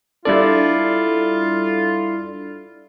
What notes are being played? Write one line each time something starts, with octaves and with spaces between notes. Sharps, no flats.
G3 D4 E4 F4 A4 D5